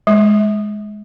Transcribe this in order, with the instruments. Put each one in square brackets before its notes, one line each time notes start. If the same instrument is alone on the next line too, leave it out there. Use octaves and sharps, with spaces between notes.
[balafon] G#3